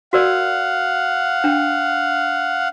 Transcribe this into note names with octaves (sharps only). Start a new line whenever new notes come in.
F#4 A#4 D5 F5 F#5
D4 G5